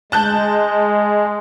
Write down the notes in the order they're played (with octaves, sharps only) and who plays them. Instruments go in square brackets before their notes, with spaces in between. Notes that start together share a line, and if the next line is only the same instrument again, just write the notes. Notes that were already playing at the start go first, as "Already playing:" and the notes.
[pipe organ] G#3 [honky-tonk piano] A5 F#6 G6